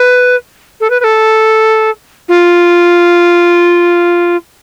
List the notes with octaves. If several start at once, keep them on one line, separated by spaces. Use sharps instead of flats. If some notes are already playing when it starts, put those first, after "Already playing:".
Already playing: B4
A4
B4
B4
A4
F4